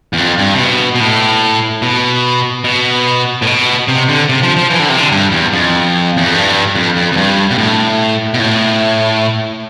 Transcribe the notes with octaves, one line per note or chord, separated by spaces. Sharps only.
E2
F2
G2
C3
B2
B2
A2
B2
B2
A2
B2
C3
D3
C3
F3
F3
E3
D3
C3
D3
G2
E2
F2
E2
F2
G2
F2
F2
F2
G2
B2
A2
B2
A2